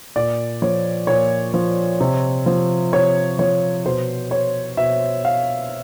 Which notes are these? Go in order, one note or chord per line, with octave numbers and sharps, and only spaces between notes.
A#2 D5
F3 C#5
A#2 C#5
F3
C3
F3
C3 C#5
F3 C#5
B2 C5
C#5
B2 E5
F5